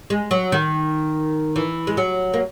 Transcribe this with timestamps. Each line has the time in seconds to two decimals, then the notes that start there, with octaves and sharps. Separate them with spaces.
0.10 G#3
0.31 F#3
0.52 D#3
1.56 E3
1.87 G#3
1.97 F#3
2.34 A#3